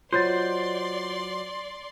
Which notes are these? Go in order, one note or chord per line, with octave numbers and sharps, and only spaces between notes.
F#3 F4 C5 D5 D#5 C6 G6 A6